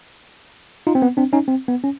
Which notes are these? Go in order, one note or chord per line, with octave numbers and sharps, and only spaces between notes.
D#4 F4
C4
B3
C4 D4
C#4 D#4
C4
B3
C#4